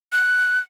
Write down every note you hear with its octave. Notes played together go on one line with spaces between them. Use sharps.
F#6